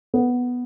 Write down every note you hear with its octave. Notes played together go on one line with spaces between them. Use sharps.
B3